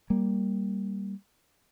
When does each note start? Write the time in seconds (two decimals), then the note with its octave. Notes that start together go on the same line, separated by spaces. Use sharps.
0.10 G3 A#3